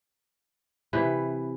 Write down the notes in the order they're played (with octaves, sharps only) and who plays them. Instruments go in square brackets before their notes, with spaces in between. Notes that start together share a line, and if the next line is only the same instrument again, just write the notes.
[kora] C3 E3 B4